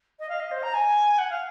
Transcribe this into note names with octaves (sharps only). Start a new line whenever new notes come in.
D#5
F5
D#5
C5
A#5
G#5
F#5
F5